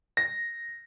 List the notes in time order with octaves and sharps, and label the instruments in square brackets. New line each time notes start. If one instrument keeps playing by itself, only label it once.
[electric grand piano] A#6